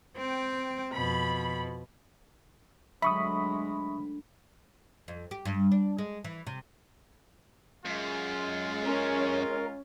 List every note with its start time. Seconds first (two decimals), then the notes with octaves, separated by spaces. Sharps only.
0.17 C4 G5
0.94 F2 B2 B5
3.02 D2 F#3 G#3 E5 B5 C#6 D#6
5.08 F2
5.31 G4
5.45 G2
5.71 D4
5.98 G#3
6.24 E3
6.47 C3
7.85 F#2 G#3 F4
8.86 C#4 A#4